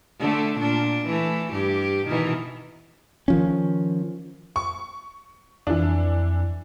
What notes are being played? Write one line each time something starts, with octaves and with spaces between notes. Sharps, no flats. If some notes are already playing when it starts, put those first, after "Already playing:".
D3 A3
A#2 D4
E3 A3
G2 G4
B2 D#3 E3
D#3 F3 C#4
C#6
F2 E3 D4